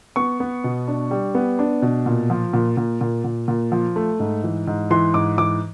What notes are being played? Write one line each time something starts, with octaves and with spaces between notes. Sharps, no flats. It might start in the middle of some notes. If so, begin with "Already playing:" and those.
B3 C#6
B3
B2
D4
G3
B3
D4
B2
A#2
F3
A#2
A#2
A#2
A#2
A#2
F3
A3
G#2
E3
G#2
E3 C6
G#2 D6
E3 D6